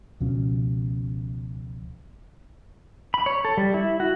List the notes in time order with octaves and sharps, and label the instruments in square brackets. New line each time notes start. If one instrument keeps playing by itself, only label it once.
[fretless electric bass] C#2 B2 F3 C#4
[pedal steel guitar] B5
C#5
A4
G3
E4
F#4